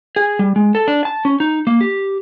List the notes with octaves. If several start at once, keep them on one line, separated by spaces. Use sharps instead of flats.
G#4
G3
G#3
A4
D4
A5
C#4
D#4
A#3
G4